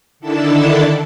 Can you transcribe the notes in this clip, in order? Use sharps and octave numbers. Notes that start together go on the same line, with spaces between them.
D3 D#3 D4 E4 A4 A5